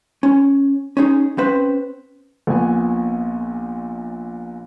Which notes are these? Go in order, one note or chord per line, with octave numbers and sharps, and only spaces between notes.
C#4
C#4 D#4 G#4
C4 C#4 B4 C5
A#1 A#2 B3 G#5